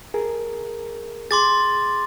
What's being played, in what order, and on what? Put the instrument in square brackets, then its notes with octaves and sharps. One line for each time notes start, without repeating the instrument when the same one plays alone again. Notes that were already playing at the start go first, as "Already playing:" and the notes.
[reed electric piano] G#4 A#4
[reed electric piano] G#4 [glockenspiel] C6 D6 A6